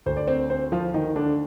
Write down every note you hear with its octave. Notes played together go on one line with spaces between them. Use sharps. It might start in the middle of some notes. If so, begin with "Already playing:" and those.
D2 D3 C5
D5
C4 C5
C4 C5
F3 F4
D#3 D#4
D3 D4